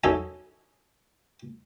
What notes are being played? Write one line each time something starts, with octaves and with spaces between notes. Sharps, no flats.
F#2 D#4 F#4 A4 G#5